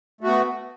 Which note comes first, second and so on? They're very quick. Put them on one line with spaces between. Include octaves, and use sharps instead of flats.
A3 F#4 B3